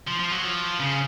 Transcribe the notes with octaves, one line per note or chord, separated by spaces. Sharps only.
F3
F3
F#3
F3
C#3